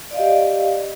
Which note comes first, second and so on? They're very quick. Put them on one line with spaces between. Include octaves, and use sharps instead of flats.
D5 F5 D#5 G4